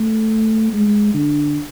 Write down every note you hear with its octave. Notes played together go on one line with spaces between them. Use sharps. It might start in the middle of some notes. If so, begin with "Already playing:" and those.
Already playing: A3
G#3
D3